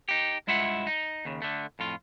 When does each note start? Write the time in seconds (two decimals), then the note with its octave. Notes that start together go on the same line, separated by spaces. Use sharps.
0.09 D#4 G4
0.47 G2 G#3 E4 F4 E5 F#5
0.87 D#4
1.25 D#2 C#3
1.42 D3 A3
1.79 F2 A2 F4